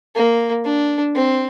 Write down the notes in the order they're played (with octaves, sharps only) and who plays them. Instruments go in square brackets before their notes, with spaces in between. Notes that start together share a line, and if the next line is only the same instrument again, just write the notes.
[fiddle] A#3
D4
C4